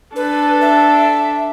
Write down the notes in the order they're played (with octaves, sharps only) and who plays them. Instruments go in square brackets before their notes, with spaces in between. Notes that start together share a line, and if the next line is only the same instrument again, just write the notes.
[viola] D4 A4 [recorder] B4
[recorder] E5